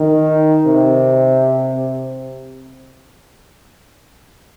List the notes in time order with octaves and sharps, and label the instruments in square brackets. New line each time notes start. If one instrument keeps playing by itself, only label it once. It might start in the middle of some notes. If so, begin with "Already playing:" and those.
Already playing: [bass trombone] D#3
C3